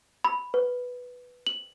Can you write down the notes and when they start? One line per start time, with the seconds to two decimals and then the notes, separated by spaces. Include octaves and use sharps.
0.24 B5
0.54 B4
1.47 F#7